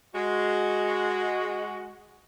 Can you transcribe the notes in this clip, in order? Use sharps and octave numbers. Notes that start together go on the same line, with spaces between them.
G#3 F#4